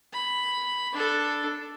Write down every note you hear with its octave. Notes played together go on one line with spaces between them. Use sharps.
B5
D4 A4